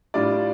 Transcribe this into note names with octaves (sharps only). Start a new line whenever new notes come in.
A2 G3 D4 F4 D5